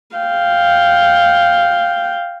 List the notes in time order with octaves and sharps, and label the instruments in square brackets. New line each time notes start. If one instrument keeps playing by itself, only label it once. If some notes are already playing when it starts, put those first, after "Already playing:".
[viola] F5 G5